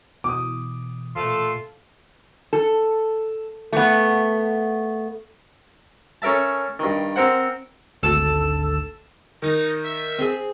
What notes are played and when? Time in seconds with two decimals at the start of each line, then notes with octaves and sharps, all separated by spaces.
0.24 B2 E3 D6 D#6
1.17 A#2 A3 F4 A4
2.53 A4
3.72 A3 B3
6.22 C#4 A4 A#4 E5 A5
6.79 G2 D#3
7.16 C4 A#4 C5 F#5
8.03 G#1 D2 A4 A5 E6 E7
9.42 D#3 D#4
9.85 E5
10.18 C4 G#4